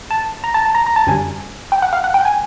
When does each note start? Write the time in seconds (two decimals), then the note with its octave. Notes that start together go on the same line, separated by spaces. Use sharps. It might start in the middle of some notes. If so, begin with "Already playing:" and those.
0.11 A5
0.44 A#5
0.54 A5
0.65 A5
0.75 A#5
0.87 A#5
0.96 A5
1.07 F#2 D3 G3 G#5
1.72 G5
1.82 F#5
1.93 F5
2.04 F#5
2.14 G5
2.25 G#5